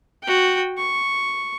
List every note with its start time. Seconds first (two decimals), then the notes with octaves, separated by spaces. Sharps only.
0.23 F#4 G5
0.77 C#6